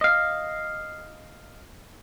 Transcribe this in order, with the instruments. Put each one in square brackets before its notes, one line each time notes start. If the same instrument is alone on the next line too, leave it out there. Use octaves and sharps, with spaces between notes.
[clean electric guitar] D#5 F5